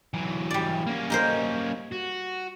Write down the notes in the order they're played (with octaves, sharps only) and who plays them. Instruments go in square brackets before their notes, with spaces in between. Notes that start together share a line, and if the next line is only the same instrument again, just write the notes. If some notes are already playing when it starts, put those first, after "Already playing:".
[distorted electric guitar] E3 F#3
[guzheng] G3 D5
[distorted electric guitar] A#3 C#4
[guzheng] D#4 A#4 C5
[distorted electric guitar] F#4